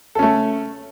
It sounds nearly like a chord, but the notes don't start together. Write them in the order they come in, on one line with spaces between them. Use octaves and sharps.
A4 C#4 A3